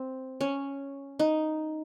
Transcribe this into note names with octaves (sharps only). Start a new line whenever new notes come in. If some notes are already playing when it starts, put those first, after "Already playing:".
Already playing: C4
C#4
D#4